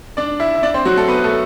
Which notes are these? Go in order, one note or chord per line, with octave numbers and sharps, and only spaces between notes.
D4 D5
E4 E5
E5
D4 D5
C4 C5
F#3 F#4
A3 A4
B3 B4
A3 A4